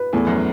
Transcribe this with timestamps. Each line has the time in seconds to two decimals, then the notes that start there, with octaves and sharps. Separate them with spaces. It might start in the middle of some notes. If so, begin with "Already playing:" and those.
Already playing: B4
0.13 E2 A2
0.27 F#2